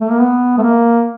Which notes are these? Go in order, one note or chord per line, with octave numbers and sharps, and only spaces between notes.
A3
A#3
B3
A3
A#3